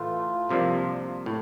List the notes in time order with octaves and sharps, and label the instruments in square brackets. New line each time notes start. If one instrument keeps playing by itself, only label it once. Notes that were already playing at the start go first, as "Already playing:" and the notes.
Already playing: [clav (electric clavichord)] A2 E3 A3 [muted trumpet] F4
[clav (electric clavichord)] C2 C3 F3 A#3 D4
A2